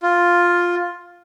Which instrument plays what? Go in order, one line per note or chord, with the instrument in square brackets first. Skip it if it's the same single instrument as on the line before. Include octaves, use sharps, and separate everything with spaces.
[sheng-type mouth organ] F4